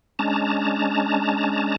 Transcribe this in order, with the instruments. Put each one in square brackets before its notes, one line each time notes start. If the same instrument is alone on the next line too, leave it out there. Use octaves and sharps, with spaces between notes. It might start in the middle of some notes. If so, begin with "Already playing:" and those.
[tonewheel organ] G#3 C#4 D4 A5 A#5